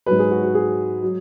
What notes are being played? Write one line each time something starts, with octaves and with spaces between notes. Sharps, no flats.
G#2 F#3 B4
G#4
F#4
F#4
G#4
F#3